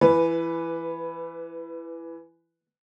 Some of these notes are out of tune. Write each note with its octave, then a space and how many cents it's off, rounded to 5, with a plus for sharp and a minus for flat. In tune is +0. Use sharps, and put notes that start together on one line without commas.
E3 +20 B4 +0